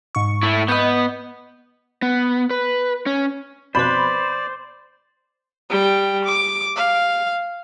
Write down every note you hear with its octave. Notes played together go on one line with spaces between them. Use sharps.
G#2 C#6
A3 E4
B3 B4 D#5 G6
B3
B4
C#4
F2 B2 B4 C5 D5 B5
G3 G5
D6
F5